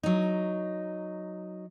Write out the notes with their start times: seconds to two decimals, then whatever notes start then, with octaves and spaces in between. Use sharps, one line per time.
0.03 F#3 D#4